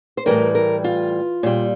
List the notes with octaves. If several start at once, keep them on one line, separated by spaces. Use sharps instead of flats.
C5
A2 E3 G3 A#4
A#4
F4
A#2 G3